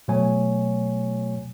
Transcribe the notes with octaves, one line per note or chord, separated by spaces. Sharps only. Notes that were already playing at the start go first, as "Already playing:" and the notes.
B2 F#3 A3 C#5 G#5